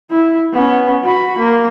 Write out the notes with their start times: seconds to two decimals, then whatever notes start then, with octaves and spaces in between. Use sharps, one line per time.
0.10 E4
0.53 B3 C#4
1.03 F#4 B5
1.38 A#3